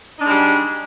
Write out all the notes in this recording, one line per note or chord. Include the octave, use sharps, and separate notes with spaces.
G3 G#3 D4 D#4